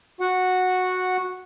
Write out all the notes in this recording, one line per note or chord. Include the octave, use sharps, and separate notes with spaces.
F#4 F#5